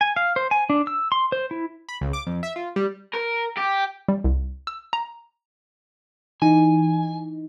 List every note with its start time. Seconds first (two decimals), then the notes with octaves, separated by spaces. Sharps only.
0.01 G#5
0.16 F5
0.36 C5
0.51 G#5
0.70 D4
0.87 E6
1.12 C6
1.32 C5
1.51 E4
1.89 B5
2.01 C#2
2.13 D6
2.26 F2
2.43 E5
2.56 F4
2.76 G3
3.13 A#4
3.57 G4
4.08 G3
4.24 C2
4.67 E6
4.93 A#5
6.42 E3 D#4 G#5